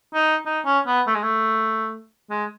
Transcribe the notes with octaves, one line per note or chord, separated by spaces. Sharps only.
D#4
D#4
C#4
B3
A3
G#3
A3
G#3